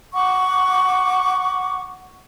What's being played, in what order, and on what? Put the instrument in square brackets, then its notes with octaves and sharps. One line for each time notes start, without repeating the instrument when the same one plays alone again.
[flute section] F#5 C#6 D6